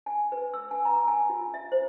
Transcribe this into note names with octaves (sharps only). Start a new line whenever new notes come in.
G#5
B4
E6
G#5
A#5
G#5
F4
E5
C5